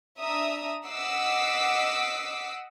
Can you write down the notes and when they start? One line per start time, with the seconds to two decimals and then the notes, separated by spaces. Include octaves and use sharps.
0.20 D4 E5 A#5 D#6
0.86 D#5 F#5 D6 E6 B6 C7